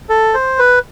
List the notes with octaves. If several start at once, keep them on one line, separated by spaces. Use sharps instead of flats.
A4
C5
B4